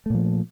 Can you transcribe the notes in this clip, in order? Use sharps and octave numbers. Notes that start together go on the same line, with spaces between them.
A#2 F3 A3